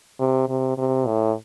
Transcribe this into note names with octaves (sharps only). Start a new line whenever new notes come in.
C3
C3
C3
A2